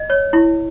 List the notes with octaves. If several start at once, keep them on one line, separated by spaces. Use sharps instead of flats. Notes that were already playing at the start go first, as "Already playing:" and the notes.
Already playing: D#5
C#5
E4